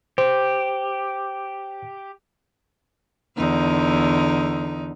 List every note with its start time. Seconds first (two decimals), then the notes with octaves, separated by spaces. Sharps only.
0.18 G4 C5
3.37 E2 D3 D#4